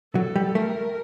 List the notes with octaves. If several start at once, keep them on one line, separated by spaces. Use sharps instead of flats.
F#3 A4
G3
A3 A#4